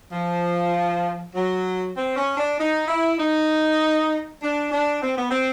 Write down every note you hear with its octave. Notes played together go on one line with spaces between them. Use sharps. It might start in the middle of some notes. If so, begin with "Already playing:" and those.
F3
F#3
C4
C#4
D4
D#4
E4
D#4
D4
D4
C4
B3
C4